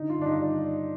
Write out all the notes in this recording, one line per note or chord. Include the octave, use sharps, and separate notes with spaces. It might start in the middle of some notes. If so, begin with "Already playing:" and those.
Already playing: D3 D#4
F4
G2 D4
D#4